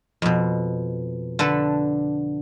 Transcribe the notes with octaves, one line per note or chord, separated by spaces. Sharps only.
F2 B2
D3 A4 B4 A5